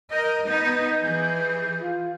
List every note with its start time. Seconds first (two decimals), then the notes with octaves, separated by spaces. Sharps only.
0.12 A#4 D#5 G6
0.45 B3 D#4
1.00 E3 G#4
1.79 F4